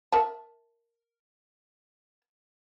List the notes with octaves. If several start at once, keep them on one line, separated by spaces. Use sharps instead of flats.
A#4 E5 A5